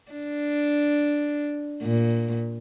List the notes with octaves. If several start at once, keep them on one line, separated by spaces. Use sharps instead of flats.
D4
A#2